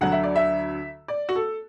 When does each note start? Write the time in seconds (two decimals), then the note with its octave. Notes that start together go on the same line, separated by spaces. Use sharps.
0.01 D2 D3 F#3 F#5
0.12 E5
0.23 D5
0.36 E5
1.08 D5
1.29 F#4
1.36 A4